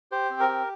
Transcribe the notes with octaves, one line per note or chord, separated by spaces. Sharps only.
G4 C5
C4
A#4
G4